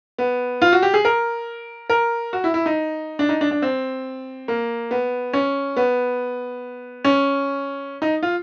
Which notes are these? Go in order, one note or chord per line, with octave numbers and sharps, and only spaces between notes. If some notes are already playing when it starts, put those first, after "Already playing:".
B3
F4
F#4
G4
G#4
A#4
A#4
F#4
E4
E4
D#4
D4
D#4
D4
D4
C4
A#3
B3
C#4
B3
C#4
D#4
F4